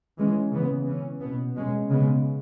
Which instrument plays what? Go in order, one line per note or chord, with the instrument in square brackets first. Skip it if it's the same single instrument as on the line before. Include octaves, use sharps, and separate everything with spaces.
[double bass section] E3 G#3 C#4
C#3 E3 B3
E3 C#4
B2 B3
B2 G#3 C#4
C#3 G#3 B3